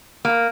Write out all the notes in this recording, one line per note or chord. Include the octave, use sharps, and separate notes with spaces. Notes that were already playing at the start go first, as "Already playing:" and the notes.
A#3